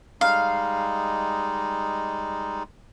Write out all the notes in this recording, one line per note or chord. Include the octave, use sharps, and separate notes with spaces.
G3 G#3 D#4 F5